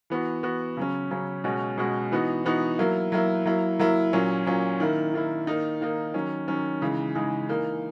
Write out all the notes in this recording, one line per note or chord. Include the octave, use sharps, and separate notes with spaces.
E3 B3 F#4
E3 B3 F#4
C#3 F#3 C#4
C#3 F#3 C#4
B2 G#3 C#4 F#4
B2 G#3 C#4 F#4
E3 B3 D#4 F#4
E3 B3 D#4 F#4
F#3 A#3 E4
F#3 A#3 E4
F#3 A#3 E4
F#3 A#3 E4
A#2 F#3 C#4
A#2 F#3 C#4
D#3 A#3 E4
D#3 A#3 E4
D#3 A#3 D#4
D#3 A#3 D#4
D#3 F#3 C#4
D#3 F#3 C#4
C#3 E3 G#3 D#4
C#3 E3 G#3 D#4
E3 A#3 D#4